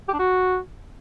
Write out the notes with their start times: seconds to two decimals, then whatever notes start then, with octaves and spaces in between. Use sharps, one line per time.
0.08 G4
0.14 D4
0.19 F#4